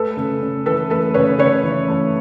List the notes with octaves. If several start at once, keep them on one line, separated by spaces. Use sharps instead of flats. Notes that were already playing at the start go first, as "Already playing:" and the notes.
Already playing: A3 A4 B4
C#3
C#3
E3 A4 B4
A3 A4 B4
C#3 B4 C#5
C#3 B4 C#5
E3
A3